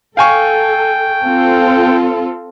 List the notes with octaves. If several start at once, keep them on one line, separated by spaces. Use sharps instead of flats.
A4 F5 G5 G#5 C#6
C4 F4 A4